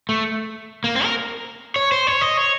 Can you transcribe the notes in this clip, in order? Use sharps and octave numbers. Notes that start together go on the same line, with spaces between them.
A3
A#3
C4
A#4
C#5
C5
C#5
D#5
C#5